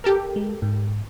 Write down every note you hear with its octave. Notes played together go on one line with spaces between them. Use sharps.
G4 A4 A#4
G#3
G#2